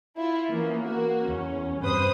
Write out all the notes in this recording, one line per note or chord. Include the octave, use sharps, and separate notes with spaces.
E4 F4
E3 A#3 B3 C#4
A#3 F#4
E2 C#4
G2 C3 B4 C5 D#6